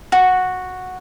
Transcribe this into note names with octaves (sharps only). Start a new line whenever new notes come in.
F#4